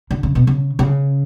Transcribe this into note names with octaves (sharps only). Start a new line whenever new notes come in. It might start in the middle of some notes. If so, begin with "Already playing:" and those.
D3
C#3
B2
C#3
C#3